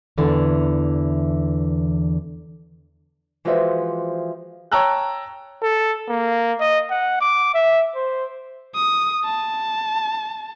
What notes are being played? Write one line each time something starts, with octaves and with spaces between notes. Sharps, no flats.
E2 D3 E3
E3 F3 G#3 F#4 C5 E5
C#5 G5 A5 A#5 E6 F#6
A4
A#3
D#5
F#5
D6
E5
C5
D#6
A5